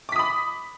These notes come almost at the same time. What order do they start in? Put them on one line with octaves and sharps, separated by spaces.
D6 B6 D#6 B5